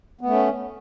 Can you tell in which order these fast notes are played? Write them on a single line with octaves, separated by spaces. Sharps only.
B3 A3 C#4